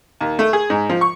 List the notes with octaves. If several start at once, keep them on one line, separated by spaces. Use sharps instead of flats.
D#2
A3
G#4
G#2
F3
C#6